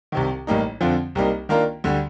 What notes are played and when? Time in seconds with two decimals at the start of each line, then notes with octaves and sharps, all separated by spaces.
0.12 C2 C3 D#3
0.47 A1 A2 G3 A#3 D#4
0.81 F2 D3 F3 C4 F4
1.15 C2 C3 G3 A#3 D#4
1.49 D#3 A#3 D4 F4 A#4
1.84 D2 D3 G3